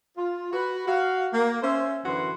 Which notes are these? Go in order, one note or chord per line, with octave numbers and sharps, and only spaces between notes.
F4
F#4 B4
F#4 F5
A#3
C#4 C5 E5
F#2 D3 E3 F#4 B4 C6